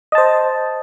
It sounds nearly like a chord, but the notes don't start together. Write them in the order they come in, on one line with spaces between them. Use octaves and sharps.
D#5 A5 C5